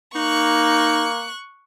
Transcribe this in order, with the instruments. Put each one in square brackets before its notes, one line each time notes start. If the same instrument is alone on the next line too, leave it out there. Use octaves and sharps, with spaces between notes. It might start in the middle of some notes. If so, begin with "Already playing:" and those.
[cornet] A#3 [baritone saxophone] D#4 [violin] C#6 F#6